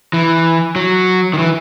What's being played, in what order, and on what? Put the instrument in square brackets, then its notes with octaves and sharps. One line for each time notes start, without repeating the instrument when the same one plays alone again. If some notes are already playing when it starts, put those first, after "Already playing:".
[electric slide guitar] E3
F#3
D#3
E3